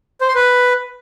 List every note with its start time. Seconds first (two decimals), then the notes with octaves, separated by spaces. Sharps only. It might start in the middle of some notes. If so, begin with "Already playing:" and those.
0.21 C5
0.28 C6
0.35 B4